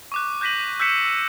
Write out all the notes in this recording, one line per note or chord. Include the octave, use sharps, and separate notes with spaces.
C#6 D6 F#6
F#6 G6 A#6 B6 D#7 F#7
E6 F#6 G6 B6 C#7 E7
E6 F#7